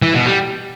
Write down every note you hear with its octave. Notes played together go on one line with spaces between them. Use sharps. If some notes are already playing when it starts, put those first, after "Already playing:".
E3
B2
G3